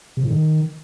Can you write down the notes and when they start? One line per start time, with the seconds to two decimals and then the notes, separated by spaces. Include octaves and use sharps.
0.17 C3
0.24 A2
0.30 D#3